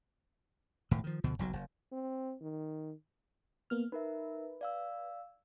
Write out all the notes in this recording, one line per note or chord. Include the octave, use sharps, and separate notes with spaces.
E1 A2 D#3
D#3 F3
D2 B2 D3 F3
F#1 B1 C3 F#3
F#1
C4
D#3
A#3 B3 F6
D#4 A#4 B4 E5
D5 F5 E6